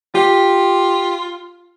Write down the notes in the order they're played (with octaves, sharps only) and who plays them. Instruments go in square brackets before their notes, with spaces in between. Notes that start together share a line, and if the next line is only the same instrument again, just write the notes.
[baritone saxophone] F4 [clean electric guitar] G4